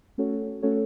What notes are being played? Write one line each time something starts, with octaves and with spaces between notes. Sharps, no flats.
A3 C#4 F#4 A4 C#5
A3 C#4 F#4 A4 C#5